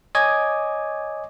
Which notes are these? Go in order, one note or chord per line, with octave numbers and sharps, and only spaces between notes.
C#5 D#5 G#5 D6 D#6 G#6